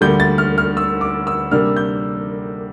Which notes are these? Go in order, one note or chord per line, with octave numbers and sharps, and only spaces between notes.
D2 D3 G3 A#3 G6
A6
F6
F6
E6
D6
E6
C3 G3 A#3 D4 F6
G6